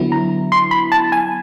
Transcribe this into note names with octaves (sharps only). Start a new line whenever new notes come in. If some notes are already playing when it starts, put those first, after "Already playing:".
Already playing: D3 F#3 B3 E4
A#5
C6
B5
A5
G#5